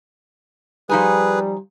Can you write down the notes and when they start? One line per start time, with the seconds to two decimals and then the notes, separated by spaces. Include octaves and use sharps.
0.89 F3 G3 D#4 G#4 B4 G#5